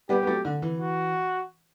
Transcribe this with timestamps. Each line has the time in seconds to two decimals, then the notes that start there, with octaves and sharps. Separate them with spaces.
0.09 G3 B3 G4
0.23 B3
0.27 F#3 A3
0.45 D3
0.62 E3
0.80 F#4